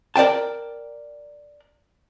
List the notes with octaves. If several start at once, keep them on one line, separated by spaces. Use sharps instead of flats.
A#4 D5 F5 G5 A5